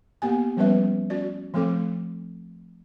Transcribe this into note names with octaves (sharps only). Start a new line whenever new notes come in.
A#3 B3 G4 G#5
F3 G3 B3 C#4 B4 E5
C#4 F#4 D5
F3 A3 C4 A4 D6